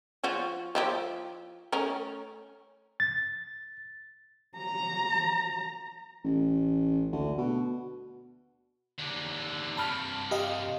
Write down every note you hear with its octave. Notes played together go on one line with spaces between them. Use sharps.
F3 F4 F#4
F3 E4 G4
A3 C#4 A#4
A6
A#5
A1
D2
B2
D#2 D3
G2 C3 A5 B5 F6
G4 D#5 F5